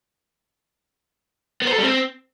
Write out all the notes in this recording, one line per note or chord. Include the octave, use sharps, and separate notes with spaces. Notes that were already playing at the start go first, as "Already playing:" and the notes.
B3
C5
A4
G3
C4